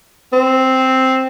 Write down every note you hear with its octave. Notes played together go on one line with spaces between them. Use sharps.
C4